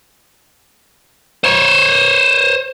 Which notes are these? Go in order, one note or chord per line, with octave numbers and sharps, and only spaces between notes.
C5 C#5